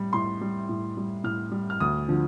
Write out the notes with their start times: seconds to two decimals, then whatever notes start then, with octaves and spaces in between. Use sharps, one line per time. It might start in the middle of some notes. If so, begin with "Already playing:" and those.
Already playing: A2 G3
0.13 A2 C6
0.41 G3
0.69 A2
0.97 G3
1.24 A2 F6
1.52 G3
1.70 F6
1.80 D2 D#6
2.08 D3 F3